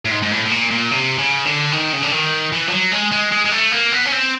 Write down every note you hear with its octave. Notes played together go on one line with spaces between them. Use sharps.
A2
G#2
G#2
A2
A2
A#2
A#2
C3
C#3
D3
D#3
C#3
D3
D#3
E3
F3
F#3
G#3
G#3
G#3
G#3
A3
A#3
B3
C#4
C4